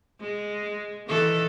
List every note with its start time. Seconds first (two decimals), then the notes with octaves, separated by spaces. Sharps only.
0.21 G#3
1.07 D#3 E3 A4